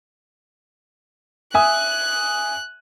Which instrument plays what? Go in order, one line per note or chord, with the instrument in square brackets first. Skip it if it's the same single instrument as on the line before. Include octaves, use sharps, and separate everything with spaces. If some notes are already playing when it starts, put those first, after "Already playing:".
[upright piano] E5 G#5 D#6 [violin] F#6